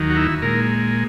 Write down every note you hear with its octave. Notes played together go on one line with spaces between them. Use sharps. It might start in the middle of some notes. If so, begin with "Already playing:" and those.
Already playing: D#2 D#3 F#3
F#4
E4
A#2 G#3 A#4